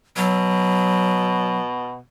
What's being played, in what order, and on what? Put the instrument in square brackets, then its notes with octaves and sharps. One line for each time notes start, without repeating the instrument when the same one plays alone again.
[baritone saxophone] B2 [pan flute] F#3